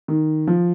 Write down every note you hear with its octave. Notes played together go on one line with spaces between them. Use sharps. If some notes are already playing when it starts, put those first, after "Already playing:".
D#3
F3